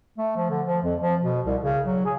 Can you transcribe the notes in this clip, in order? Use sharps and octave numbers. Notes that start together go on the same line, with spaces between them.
A3
F3
D3
F3
F2
F3
B2
C2
C#3
F#3
G#4